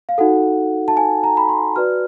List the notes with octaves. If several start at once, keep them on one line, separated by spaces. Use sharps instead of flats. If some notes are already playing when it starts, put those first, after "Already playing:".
F5
D#4 F#4 A4 F#5
A5
G#5
A#5
B5
C6
F#4 B4 D5 F6